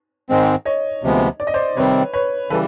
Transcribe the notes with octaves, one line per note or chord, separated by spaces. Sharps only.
G#2 D#3 G#3 C4
C#5 D#5
D2 C3 F3 G#3 B3
D5
D#5
C5 D5
C3 D#3 G3 C4 B4 C#5
B4 C#5
C#3 E3 G3 A4 B4